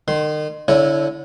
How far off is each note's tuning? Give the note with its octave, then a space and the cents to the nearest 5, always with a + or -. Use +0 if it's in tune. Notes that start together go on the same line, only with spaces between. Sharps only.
D#3 -35 C6 +0
D3 -25 E4 +0 C#5 -5